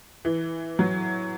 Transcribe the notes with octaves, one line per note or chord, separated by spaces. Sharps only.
E3
F#3